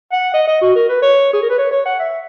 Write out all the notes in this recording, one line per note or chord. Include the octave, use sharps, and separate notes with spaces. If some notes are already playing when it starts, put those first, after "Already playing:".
F#5
D#5
D#5
F#4
A#4
B4
C#5
G#4
A#4
B4
C#5
C#5
F#5
E5